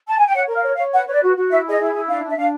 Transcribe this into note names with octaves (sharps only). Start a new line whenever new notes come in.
A5
G#5
G5
C#5 F#5
A#4
F5
C#5
F5
C#5
B4 F#5
B4 C#5
D5
F#4
F#4
E4 E5
G#4 D#5
E4
E4
D4 F5
D4
E5
D4 F5